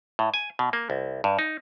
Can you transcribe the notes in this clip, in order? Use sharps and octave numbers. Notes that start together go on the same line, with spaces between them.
A2
G#5
B2
A#3
C2
G2
D#4